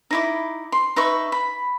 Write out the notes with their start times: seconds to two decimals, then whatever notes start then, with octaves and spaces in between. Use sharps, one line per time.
0.11 D#4 E4 D6
0.72 C6
0.96 D#4 B4 E5 C#6
1.32 B5